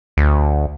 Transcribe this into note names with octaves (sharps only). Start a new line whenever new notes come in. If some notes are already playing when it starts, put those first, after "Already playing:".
D2